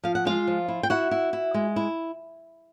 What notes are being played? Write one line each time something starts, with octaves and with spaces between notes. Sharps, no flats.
F3 F5
F#5
G#3 F4 F5
F3
E4
G5
E4 F#4 F#5
E4
E4
G#3
E4